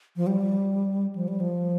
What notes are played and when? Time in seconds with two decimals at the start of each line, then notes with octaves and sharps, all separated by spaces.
0.16 F3
0.27 G3
1.15 F3
1.28 G3
1.40 F3